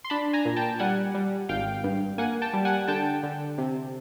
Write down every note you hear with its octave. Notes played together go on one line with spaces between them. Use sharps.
C6
D4 A5 B5
G#5 A#5
A#2
G5 A5
G3 F#5 G#5
G3
G#1 F5 G5
G2
A#3 F#5 G#5
G5 A5
G3
F#5 G#5
D3 G5 A5
D3
C3